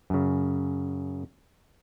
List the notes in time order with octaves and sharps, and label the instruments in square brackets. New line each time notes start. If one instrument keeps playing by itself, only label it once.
[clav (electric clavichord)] F#2 C#3